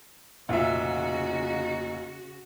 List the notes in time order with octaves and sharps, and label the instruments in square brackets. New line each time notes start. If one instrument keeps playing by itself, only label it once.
[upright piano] F1 A#2 E5 [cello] C#3 F#4 [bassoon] D#4